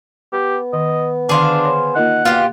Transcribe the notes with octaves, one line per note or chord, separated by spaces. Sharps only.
B3 G4
D#3 D#5
D3 D#3 D4 G#4 C5 F5
C#5
A#3 D#4 F4 A#4 F#5
B2 A#3 F4 G4